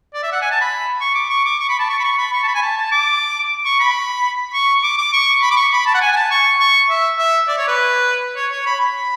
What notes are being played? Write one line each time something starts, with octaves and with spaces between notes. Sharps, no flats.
D5
E5
F#5
G#5
A5
B5
C#6
D6
C#6
D6
C#6
B5
A5
C#6
B5
C#6
B5
C#6
A5
B5
G#5
A5
A5
D6
C#6
B5
C#6
D6
D6
C#6
B5
D6
C#6
B5
A5
F#5
G#5
G#5
A5
C#6
C#6
E5
E5
D5
C#5
B4
C#5
C#5
B5
B5